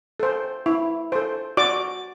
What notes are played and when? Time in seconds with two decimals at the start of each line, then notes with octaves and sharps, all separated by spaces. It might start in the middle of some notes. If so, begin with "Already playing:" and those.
0.20 A4 C5
0.66 E4
1.12 A4 C5
1.57 F#4 D5 D6